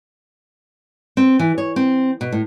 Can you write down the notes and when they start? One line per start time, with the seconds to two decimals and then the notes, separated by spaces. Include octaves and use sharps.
1.17 C4
1.39 E3
1.58 C#5
1.76 C4
2.21 B2
2.32 A2